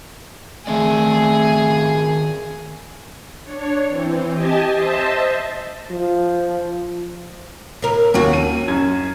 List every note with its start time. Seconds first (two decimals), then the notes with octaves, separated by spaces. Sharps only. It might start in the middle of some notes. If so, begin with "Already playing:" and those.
0.67 D#3 A3 C4 G#4 D5
3.44 D4 C#5
3.87 E3 C4
4.32 G4 D#5 G#5 A5
4.71 C5 D#5 E5 A5
5.90 F3
7.82 A2 A#4
8.14 D#2 C#4 F#4
8.33 D#7
8.68 F#2 G#6